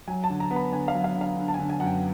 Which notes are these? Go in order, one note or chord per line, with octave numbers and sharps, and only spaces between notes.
F#3 G#5
A5
D3
A#5
B3
B5
D3 G#5
F5
F#3
F5
D3
F5
D3
A5
G#5
D3
G#5
F#2 F#5
G5